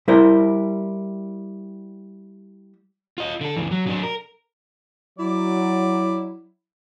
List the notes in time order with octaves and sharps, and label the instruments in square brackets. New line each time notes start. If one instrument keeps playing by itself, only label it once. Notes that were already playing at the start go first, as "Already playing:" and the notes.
[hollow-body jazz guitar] G3 E4 A#4 C5
[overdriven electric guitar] F4 D#5
D3 A4
C#2 E3
F#3
F#3 D4
A#4
[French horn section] F#3 [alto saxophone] E4 [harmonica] D5